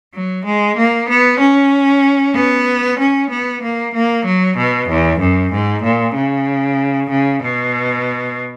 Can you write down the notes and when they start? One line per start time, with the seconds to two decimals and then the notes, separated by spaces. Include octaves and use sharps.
0.15 F#3
0.46 G#3
0.78 A#3
1.09 B3
1.41 C#4
2.35 B3
3.00 C#4
3.30 B3
3.63 A#3
3.95 A#3
4.25 F#3
4.58 B2
4.89 E2
5.20 F#2
5.53 G#2
5.84 A#2
6.15 C#3
7.10 C#3
7.43 B2